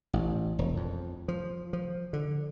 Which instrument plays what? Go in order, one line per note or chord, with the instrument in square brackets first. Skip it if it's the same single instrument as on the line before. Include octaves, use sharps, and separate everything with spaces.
[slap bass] A1
E1
F2
F3
F3
D3